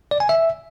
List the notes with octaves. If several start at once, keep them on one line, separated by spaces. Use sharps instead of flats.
D5
G#5
E5